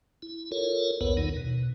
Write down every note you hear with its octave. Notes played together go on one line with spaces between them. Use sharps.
E4
F4 A4 A#4 C#5
B1 E2 B3 A#4 B4 C#5
E2 D#3 D#4
B2